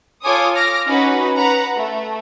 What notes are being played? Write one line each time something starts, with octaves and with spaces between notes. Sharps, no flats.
F4 A4 C#5 G#5 D6 D#6
D6 F6 A#6
C#4 D#4 F#4 B4
B4 F#5 A#5
A3